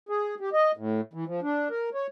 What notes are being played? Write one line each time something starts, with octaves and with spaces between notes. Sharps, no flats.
G#4
G4
D#5
A2
E3
F3
D4
A#4
C#5